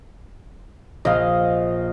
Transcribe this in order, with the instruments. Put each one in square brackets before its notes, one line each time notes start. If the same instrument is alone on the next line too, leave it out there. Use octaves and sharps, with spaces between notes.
[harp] A#1 [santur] D#5 F5